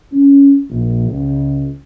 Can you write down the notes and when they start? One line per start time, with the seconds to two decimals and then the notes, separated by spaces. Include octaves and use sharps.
0.12 C#4
0.70 A#1
1.07 C#2